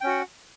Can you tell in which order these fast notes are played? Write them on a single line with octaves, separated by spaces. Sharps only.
G5 C#4 F#4 F#5